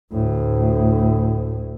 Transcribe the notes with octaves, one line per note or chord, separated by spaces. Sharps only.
D2 A2